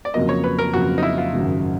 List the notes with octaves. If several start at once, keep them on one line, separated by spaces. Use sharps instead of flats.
D5
F2 C#3 F#3 A#3 D#5
C#5
B4
A#4
F2 C#3 F#3 A#3 F#4
D#4
E4
F4
G#1 F#2 C#3